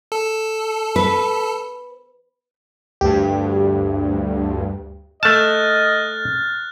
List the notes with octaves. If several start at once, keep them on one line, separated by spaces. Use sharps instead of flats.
A4
B4
D2 G2 G4
A3 D#5 A5 F6 F#6 A6